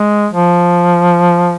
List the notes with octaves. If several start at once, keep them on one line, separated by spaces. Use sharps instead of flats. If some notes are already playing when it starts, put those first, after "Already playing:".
Already playing: G#3
F3